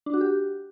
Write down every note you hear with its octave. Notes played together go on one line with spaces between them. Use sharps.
D4
F#4
G4